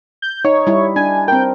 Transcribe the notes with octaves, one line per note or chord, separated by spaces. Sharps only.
G6
D#4 C#5
G3 E4
D4 G#5
C4 A#4 G5